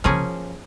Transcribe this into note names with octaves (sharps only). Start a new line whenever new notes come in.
C#3 F3 A#3 C#4 G#4